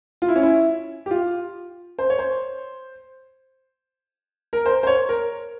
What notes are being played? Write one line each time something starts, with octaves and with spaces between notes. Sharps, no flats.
F4
E4
C#4
E4
G4
F4
C5
C#5
C5
A#4
C5
C5
C#5
A#4